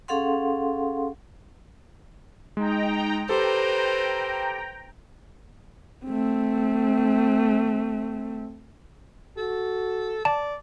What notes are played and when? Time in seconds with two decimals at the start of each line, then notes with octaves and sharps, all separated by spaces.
0.08 C#4 G#4 A4 F5 F#5 C6
2.57 G#3 D#4 G5 A#5
3.29 G4 A4 B4 C5 G5 A#5
6.06 A3 C4
9.37 F#4 A4
10.25 D5 A5